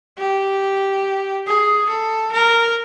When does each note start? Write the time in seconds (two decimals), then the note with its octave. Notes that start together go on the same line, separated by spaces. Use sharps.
0.18 G4
1.47 G#4
1.89 A4
2.32 A#4